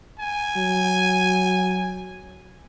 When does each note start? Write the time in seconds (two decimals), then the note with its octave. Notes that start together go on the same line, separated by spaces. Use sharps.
0.20 G#5
0.57 F#3